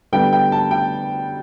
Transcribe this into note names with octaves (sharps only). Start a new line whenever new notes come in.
D3 G3 B3 G5
G5
A5
G5